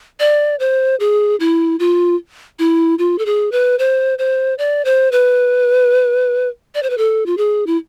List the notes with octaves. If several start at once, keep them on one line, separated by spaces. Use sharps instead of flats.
D5
C5
G#4
E4
F4
E4
F4
A4
G#4
B4
C5
C5
D5
C5
B4
D5
C5
B4
A4
F4
G#4
E4